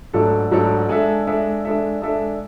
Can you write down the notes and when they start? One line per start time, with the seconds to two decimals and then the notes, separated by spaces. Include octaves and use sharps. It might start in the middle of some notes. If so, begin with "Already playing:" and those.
0.13 G#2 F#3 A3 D4 A4
0.51 G#2 F#3 A3 D4 A4
0.89 G#3 D4 A4 E5
1.27 G#3 D4 A4 E5
1.65 G#3 D4 A4 E5
2.02 G#3 D4 A4 E5